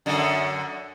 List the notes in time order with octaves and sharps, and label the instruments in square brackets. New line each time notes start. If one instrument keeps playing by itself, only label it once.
[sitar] F#2 D3